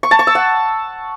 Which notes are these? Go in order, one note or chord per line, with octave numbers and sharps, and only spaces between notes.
C#6
A5
C#6
E6
F#5